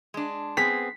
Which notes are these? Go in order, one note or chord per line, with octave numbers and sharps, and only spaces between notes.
G#3 D4
B3 C4 G#4 B6